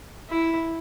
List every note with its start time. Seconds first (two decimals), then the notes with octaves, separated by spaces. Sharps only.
0.30 E4